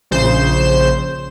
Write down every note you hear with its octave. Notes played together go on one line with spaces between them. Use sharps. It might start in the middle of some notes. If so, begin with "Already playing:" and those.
A#1 C#3 C5 C7 E7